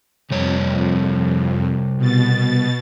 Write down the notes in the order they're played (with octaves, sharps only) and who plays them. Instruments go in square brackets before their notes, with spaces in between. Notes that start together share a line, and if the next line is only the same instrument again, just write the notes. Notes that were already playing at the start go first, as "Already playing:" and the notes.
[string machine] F2 [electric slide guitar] C3 G3 C#5
[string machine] B2 A6